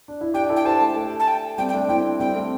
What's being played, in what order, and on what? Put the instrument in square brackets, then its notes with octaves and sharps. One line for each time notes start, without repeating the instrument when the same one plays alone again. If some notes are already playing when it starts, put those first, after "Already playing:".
[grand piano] D4
E4
[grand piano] D4 G4 [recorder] G5
[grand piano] E4 A4
[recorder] G5
[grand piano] G4 C5 [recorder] A5
[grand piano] A3
A3
[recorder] A5
G5
[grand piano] G3 C4 [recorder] G5
[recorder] G5
[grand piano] A3 D4
[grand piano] C4 E4 [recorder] G5
[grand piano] G3 C4 [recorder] G5
[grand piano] A3